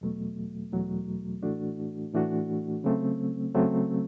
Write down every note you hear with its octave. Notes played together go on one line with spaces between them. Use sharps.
E2 B2 F#3 A3
E2 B2 F#3 A3
A2 E3 A3 D4 F#4
A2 E3 A3 D4 F#4
C#3 F#3 A3 C4
C#3 F#3 A3 C4